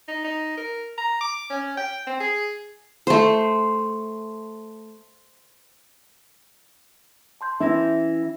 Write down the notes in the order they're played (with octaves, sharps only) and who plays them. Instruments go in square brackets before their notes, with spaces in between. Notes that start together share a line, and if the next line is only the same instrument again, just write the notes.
[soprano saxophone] D#4
D#4
A#4
A#5
D6
C#4
G5
C4
G#4
[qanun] A3 C5
[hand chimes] A5 C6 G6
[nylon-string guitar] E3 E4 [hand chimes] C#4 E5 A#6